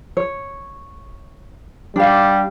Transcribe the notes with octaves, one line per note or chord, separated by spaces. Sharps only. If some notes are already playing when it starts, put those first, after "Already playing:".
C#5
G3 D4 F5